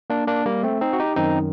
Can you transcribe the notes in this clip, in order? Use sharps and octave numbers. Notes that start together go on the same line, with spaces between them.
A#3 D4
A#3 D4
G3 A#3
A3 C4
C4 D#4
F#4
D#4 G4
F#2 D#3 C4 D#4